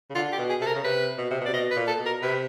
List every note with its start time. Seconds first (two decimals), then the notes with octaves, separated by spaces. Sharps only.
0.10 C#3
0.15 D3 F4
0.32 G4
0.38 B2
0.49 G#4
0.61 C3 A4
0.66 A#4
0.75 C#3
0.84 C3 B4
1.18 B2
1.30 C3
1.41 B2
1.46 C3 D5
1.53 B2 D#5
1.71 B4
1.76 A#2
1.87 A4
1.99 B2
2.06 A#4
2.22 C3 B4